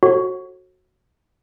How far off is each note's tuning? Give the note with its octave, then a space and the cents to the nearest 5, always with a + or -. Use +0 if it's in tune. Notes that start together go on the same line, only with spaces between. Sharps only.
F#4 +0 A4 +0 C#5 -45